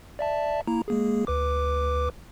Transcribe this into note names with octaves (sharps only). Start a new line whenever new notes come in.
D5 E5 A5
A#3 E4 A#5
G#3 A#3 G#4
D2 B4 D6